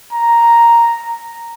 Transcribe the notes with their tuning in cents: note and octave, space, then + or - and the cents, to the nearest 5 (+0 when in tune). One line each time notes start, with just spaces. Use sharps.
A#5 +0